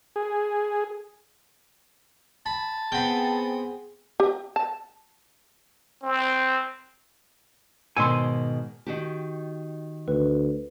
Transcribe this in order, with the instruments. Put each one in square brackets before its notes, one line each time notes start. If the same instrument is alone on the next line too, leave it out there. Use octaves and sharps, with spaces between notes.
[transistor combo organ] G#4
[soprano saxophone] A5 [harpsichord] B5
[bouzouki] B3 C4 [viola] G#4 [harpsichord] G5 B5
[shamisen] G4
A5
[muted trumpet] C4
[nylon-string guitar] G#2 B2 D#3 [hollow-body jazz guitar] G#5 C6 [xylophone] E6 C#7
[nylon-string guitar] D#3 F#4 G4
[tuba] D2 [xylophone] B4